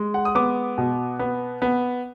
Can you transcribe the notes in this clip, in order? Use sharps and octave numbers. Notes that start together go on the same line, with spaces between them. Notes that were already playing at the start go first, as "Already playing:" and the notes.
Already playing: G#3
F#5
D#6
B3 D6
B2
B3
B3